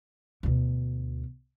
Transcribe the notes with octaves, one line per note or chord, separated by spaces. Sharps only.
D2 B2